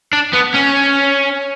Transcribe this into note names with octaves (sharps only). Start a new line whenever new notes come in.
D4
B3
C#4